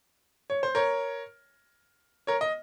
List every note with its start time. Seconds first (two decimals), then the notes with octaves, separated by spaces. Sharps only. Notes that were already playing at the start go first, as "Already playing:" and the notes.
0.50 C#5
0.63 C5
0.75 A#4 C#5
2.27 A#4 C#5
2.41 D#5